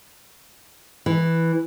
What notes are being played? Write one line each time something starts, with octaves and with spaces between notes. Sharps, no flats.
E3